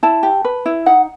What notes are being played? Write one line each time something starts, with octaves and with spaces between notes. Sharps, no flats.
E4 A5
G4
B4
E4
D#4 F#5